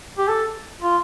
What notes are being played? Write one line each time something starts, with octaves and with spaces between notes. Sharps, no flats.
G4
A4
F4